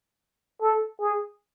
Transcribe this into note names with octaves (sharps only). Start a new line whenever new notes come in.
A4
G#4